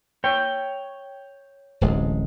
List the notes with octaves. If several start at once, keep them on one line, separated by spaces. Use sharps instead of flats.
C#5 G5
D1 A1 G#3